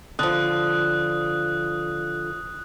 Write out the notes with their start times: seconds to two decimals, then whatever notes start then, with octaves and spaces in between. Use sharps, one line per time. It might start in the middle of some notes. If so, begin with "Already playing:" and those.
0.19 D3 F3 D#6 F#6